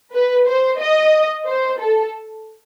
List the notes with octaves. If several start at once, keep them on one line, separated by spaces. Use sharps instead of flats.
B4
C5
D#5
C5
A4